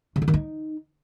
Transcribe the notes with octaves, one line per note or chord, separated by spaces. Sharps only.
C3
D3
D#3
D#4